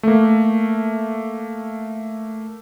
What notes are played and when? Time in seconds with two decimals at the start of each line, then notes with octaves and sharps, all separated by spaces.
0.03 A3 A#3